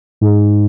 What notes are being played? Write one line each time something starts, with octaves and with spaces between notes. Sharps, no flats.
G#2